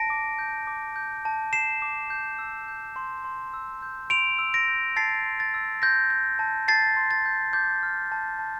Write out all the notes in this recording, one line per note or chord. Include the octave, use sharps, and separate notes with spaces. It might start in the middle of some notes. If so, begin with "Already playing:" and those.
Already playing: A5 A#6 D7
D6
G6
D6
G6
A5
A5 C7 E7
D6
G6
E6
G6
C6
C6
E6
G6
C6 D7 F7
E6
A#6 D7
G6
A5 A6 C7
C6
A6
E6
C6 G6 A#6
G6
A5
A5 A6 C7
C6
A6
G6
D6 G6
F6
A5
A5